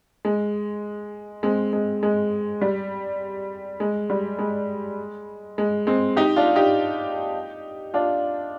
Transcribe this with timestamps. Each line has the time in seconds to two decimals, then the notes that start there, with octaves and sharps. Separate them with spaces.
0.25 G#3
1.43 G#3 C4
1.73 G#3
2.03 G#3
2.61 G3
3.80 G#3
4.10 G3
4.39 G#3
5.58 G#3
5.87 G#3 C4
6.16 D#4 G4
6.36 D4 F4
6.56 D#4 G4
7.94 D4 F4